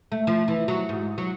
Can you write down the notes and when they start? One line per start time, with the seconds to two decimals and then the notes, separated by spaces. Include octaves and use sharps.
0.12 A3
0.27 F3
0.48 E3
0.68 F#3
0.89 G#2
1.18 F#3